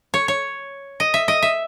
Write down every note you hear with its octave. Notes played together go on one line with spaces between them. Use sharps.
C#5
C#5
D#5
E5
D#5
E5